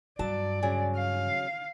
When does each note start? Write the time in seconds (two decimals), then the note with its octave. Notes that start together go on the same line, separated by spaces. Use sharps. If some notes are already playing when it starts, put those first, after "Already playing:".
0.19 G2 F#3 D5 A5
0.63 C#3 F#3 G#5
0.96 F5